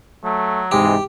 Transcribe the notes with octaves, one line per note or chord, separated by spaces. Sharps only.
F#3 A3
G#2 C3 E3 G#3 G4